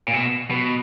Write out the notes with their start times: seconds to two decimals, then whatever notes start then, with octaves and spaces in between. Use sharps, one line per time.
0.08 A#2
0.13 B2
0.50 B2